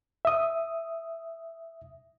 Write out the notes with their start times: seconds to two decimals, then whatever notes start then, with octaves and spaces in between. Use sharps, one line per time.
0.25 E5 D#6